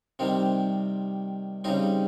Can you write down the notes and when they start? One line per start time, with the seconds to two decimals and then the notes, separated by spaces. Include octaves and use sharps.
0.19 C3 D#3 G3 C4
1.64 C#3 G3 C4 D#4